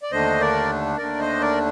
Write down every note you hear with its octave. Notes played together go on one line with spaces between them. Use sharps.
D5
D#2 D3 A3 D4 C5 D#5
A#4 D5
D#2 D3 A3 D4 A#4 D5
C5 D#5
A#4 D5